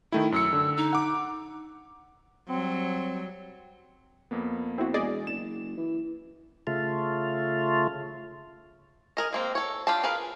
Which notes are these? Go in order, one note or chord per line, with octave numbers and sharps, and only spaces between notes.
D#3 A3 E4 G5
F#2 E6 C#7
D3
D#4
F#5 D6
F#3 G3 C4
F2 A#3 B3
C4 E4 F#4
E1 G#4 D5 D#5
F#1 E7
E3
C#3 A3 F4
G#4 A#4 D#5
G#3 A#3 C4
A4 C#5
D4 F4 G4 F5 A5
F4 G#4 A#4 B4 F5